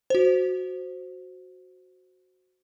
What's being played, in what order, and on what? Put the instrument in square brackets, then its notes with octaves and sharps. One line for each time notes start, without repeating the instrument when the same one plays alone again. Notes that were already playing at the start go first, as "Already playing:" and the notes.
[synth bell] F#4 C5